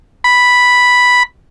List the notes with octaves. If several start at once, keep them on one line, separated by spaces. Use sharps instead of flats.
B5